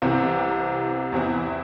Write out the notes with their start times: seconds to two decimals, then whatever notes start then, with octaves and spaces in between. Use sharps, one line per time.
0.02 C2 C3 E3 C4
1.12 E2 E3 C4 E4